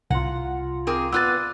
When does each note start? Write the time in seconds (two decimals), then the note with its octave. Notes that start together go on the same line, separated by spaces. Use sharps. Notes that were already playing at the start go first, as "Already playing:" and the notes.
0.10 C2 F4 F#5 A#5
0.87 C4 G#4 A#4 D6
1.12 B3 F4 B4 D5 E6 F#6 A6